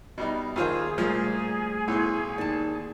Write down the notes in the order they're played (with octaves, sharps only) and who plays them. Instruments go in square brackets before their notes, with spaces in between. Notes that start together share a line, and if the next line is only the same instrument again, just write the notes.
[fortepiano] B2 G3 D#4 [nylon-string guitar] G#4
[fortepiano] D#2 F4 C5 [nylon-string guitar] D#3 G#5 [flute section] G#4
[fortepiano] A#2 F3 [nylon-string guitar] G3 A3
[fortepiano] B1 C6 [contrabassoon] A2
[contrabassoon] D#2 [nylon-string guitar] D5 A5